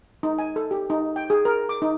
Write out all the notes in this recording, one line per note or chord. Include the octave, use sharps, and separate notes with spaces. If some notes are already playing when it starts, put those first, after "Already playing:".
D#4
G#5
A4
G4
D#4
G5
G#4
A#4
D6
D#4